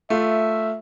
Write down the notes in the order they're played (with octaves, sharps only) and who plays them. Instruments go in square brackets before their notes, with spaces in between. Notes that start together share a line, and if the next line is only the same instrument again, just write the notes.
[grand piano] A3 F4 [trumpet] E5